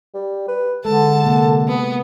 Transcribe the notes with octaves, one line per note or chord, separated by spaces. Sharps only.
G3
B4
D3 G#3 A4 A5
C3 A#3 F#5
B3